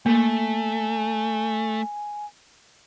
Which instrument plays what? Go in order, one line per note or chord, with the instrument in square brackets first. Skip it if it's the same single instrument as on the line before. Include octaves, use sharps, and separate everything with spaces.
[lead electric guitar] A3 [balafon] A#3 [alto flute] G#5